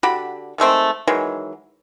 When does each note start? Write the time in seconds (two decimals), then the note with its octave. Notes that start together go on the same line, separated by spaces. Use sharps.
0.03 D3 F#4 G4 B5
0.58 D#3 G#3 A3 C4
1.07 D#3 E3 F#3 G#3